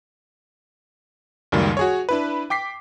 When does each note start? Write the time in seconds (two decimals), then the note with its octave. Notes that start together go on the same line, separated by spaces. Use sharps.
1.52 C#2 F#2 D#3 G3 A#3
1.77 F#4 G#4 C#5
2.09 D4 E4 B4
2.50 G5 D6 B6 C7